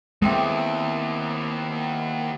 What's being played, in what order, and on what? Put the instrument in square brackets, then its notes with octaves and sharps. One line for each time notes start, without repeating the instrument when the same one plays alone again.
[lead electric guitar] D#2 [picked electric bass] G#3 [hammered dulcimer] B3 C4 E4